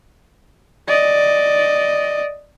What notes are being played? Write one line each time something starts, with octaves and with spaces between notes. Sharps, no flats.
D5 D#5